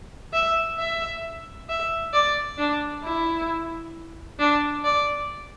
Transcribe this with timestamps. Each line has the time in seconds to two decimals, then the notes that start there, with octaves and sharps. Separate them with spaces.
0.33 E5
0.78 E5
1.69 E5
2.13 D5
2.58 D4
3.04 E4
4.39 D4
4.84 D5